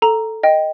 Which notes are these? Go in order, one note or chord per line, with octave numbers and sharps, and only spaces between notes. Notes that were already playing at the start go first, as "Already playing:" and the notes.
A4 A#5
D#5 G5